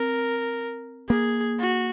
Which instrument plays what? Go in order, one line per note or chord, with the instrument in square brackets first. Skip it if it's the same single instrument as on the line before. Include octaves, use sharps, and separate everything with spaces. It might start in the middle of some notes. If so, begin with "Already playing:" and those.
Already playing: [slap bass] C4 [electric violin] A#4
[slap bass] A#3 [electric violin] G#4
[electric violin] F#4